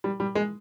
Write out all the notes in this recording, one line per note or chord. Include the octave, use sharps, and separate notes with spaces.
G3
G3
G#3